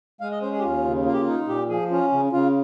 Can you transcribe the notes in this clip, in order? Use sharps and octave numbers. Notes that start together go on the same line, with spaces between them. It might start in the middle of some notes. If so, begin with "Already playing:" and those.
G#3 F5
D#5
C#4 C5
G#4
G4
D#2 F4
C#3
A#3 F4
G4
F4
D#4
A#2 G4
F3 G#4
C#4 F4
C#3
C#3 F4